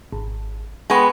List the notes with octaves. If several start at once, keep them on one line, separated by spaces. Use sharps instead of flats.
G#1
G#3 B3 G5 C#6